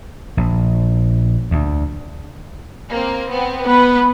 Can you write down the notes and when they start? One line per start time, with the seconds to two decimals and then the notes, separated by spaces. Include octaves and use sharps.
0.37 A#1
1.51 D2
2.90 A#3 C4
3.30 B3 C4
3.66 B3 B4